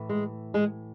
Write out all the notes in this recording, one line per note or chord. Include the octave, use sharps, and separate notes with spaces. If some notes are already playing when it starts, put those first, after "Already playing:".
Already playing: A2 E3
G#3
G#3